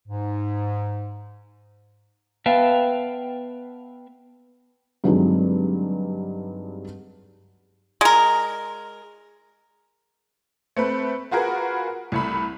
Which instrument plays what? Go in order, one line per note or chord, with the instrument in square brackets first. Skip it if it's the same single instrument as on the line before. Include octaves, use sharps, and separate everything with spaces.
[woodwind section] G#2
[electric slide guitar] B3 B4 E5 F5 G5 A5
[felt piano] G2 D3 F#3 G#3 C4 D#4
[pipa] G#3 A#4
[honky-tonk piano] A3 C4 B4
F4 F#4 G#4 A#4 B4
C2 A3 B5